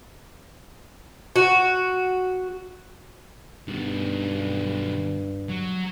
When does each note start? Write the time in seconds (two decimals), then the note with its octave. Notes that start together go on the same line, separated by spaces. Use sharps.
1.36 F#4
3.68 G2 B2 D#3
5.49 F#3